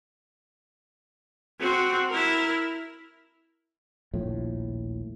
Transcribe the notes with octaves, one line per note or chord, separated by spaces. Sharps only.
C4 F#4
E4 A#4
D#1 A#1 A2 F3